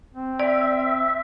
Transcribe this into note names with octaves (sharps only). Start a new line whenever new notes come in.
C4
D5 E5